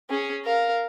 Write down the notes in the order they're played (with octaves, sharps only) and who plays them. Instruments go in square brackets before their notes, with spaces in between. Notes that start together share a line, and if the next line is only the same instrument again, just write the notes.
[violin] C#4 G#4
A#4 F5